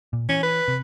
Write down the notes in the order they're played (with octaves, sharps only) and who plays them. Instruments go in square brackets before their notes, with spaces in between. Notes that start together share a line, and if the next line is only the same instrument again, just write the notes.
[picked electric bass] A#2
[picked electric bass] E3 [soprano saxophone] C#4
[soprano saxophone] B4
[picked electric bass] C3